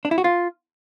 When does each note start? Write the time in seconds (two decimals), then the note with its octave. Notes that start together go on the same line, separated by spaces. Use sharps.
0.05 D4
0.11 E4
0.18 F#4
0.24 F4